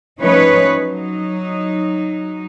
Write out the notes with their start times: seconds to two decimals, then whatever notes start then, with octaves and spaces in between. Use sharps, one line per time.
0.19 F3 A3 C#4 D#4 B4 C#5
0.76 F#3 D#4